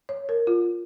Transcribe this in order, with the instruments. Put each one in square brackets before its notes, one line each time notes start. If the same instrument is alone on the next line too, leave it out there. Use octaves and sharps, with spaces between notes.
[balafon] C#5
A#4
F4